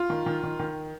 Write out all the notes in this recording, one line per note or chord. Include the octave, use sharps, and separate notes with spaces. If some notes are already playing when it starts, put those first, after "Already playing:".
Already playing: F4
D#3
D#3
D#3
D#3